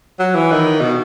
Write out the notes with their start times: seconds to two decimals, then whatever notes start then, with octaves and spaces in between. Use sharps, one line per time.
0.19 F#3
0.35 E3
0.51 D#3
0.81 B2